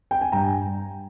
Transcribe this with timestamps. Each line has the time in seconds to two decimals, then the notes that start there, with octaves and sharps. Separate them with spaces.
0.11 G5
0.21 G#5
0.32 G2 G5 A#5